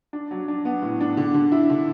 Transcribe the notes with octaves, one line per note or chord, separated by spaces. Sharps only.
D4
F#3
D4
B3
A2
D4
D3
D3
E4
D3